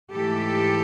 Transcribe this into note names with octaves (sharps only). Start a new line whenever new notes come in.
G#2 E3 A3 G4 A4